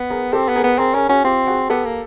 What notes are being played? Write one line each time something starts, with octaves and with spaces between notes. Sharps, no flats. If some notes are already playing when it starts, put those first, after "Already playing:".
Already playing: B3
G#4 A#4
C4 G4 A4
B3
G#4 A#4
B3
C4 G#4 A#4
C#4 G#4 A#4
C#4 F#4 G#4
C4 F4 G4
F#4 G#4
B3 G4 A4
A#3